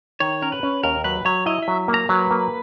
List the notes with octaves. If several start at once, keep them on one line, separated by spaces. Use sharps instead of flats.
D#3 C#5
C#4 A#4
B4
C#4
D#2 A#4
F#3 B4
F#3 C#5
E4 D#5
E5
F#3
A#3
A#5
F#3 B4
A#3